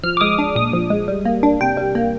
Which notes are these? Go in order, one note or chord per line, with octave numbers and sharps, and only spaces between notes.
F3 F6
D6
G#3 D#6
D4
A#2 D#6
F3
G#3
G3
A#3
D4
C3 G5
G3
A#3